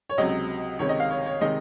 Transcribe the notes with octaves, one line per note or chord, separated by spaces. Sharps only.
C#5
C#2 C3 F#3 D#5
C#2 C3 D#3 C#5
D#5
F5
C#5
C#5
C3 D#3 G#3 D#5